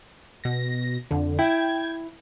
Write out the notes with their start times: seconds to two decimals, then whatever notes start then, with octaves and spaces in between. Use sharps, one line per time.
0.44 B2 A#6
1.11 F2 D3
1.39 E4 G5 G#6